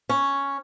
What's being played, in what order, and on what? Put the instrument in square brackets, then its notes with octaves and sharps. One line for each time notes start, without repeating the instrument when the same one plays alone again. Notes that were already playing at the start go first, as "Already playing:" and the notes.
[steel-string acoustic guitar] C#4